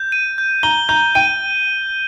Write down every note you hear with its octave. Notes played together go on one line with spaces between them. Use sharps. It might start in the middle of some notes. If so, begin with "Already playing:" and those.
Already playing: G6
D#7
G6
A#5 G7
A#5 G6
G5 D#7